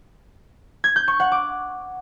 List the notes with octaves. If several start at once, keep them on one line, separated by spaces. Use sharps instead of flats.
G#6
G6
C#6
F#5
D6